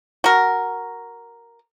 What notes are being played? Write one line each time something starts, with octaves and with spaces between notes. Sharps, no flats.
F#4 A#4